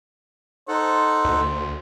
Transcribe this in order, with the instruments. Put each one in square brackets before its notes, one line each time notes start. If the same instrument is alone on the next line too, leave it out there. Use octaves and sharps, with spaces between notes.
[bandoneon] D#4 A4 F#5 [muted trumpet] C5
[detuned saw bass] D2